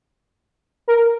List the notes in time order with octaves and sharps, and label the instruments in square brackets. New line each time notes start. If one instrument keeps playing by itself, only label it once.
[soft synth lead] A#4